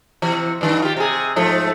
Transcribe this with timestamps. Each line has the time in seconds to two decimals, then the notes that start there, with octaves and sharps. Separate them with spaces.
0.22 C3 E3
0.61 G2 D#3
0.82 F4 G4
0.97 C3 G#4
1.36 G#2 F3 A3